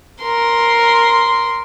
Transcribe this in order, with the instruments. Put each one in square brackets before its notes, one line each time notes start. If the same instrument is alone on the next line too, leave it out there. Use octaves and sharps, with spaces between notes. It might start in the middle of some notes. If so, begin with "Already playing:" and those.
[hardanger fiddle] A#4 C6